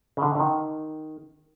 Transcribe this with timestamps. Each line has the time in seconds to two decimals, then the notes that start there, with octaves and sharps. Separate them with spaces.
0.17 C#3
0.22 D3
0.35 D3
0.39 D#3